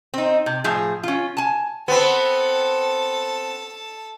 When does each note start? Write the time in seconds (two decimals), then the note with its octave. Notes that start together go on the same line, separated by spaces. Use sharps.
0.14 C4 D#4
0.46 C3
0.64 A2 F3 G#4
1.04 C#4 F4
1.37 G#5 A5
1.88 B3 C4 A4 A5